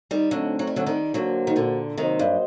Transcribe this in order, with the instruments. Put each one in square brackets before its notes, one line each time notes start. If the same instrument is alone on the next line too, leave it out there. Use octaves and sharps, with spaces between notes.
[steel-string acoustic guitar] D#3 G3
[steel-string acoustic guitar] D3 F#3 [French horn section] A3 C4 D#4
[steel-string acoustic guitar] F#3
G3
D3 F#3
D#3 G3
[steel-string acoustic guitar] D3 F#3 [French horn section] A#3 F#4 C5
[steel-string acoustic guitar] D#3
A#2 D3
[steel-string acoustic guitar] C3 D#3 [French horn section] F#3 A#3 F#4 C5 D#5
[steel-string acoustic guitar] G2